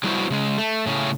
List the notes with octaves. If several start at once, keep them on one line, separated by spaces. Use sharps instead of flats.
F#3 G3 B3 E4 F#4 C5
C#3 G#3
A3
A2 C#3 C#4